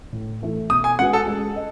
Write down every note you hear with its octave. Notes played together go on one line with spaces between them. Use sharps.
A2
E3 A3 E4
B2 D#6
G#5
G#3 C#4 F#4 B4 F#5
A4
G#3
D#5